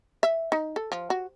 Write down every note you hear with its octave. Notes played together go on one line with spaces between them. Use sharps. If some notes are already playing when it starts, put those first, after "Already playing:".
E5
D#4
A4
F3
F#4